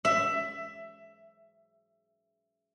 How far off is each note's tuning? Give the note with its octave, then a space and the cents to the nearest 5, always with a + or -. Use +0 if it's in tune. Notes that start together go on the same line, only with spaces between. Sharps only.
E5 +15